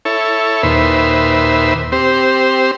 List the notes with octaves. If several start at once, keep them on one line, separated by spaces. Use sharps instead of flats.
E4 A4 C#5
D#2 A#2 B4 C5 E5
C4 G4 C5